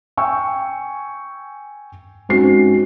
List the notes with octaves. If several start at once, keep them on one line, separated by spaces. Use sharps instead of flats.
G5 G#5 C#6 E6
G#2 C4 C#4 F#4 C7